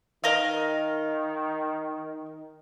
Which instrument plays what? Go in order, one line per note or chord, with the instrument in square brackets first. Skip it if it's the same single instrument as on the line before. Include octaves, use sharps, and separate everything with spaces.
[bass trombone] D#3 [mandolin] A#4 D#5 F5